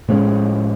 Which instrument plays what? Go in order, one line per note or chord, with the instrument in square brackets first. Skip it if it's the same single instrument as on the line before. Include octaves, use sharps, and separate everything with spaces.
[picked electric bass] A2 F3 G#3 C#4